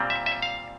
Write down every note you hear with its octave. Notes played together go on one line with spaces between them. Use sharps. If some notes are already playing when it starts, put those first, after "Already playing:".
Already playing: A#2 G3 C4
E5
E5
F5